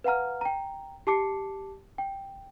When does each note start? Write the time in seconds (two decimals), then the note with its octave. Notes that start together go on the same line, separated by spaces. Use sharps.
0.04 B4 F5 F#5 A#5 F6
0.41 G5 A#5
1.07 G4 A5 D6 C7 C#7
1.98 G5